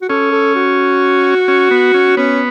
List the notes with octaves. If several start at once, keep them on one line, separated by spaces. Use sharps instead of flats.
F#4
C#4 A4
A4
F#4
C#4
B3
C#4
B3 C#4